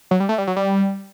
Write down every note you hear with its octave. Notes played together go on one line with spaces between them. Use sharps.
F#3
G3
A3
G3
F#3
G3